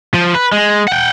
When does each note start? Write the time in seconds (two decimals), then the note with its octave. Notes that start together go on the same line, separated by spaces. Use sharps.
0.14 F3
0.35 B4
0.52 G#3
0.88 F#5 G5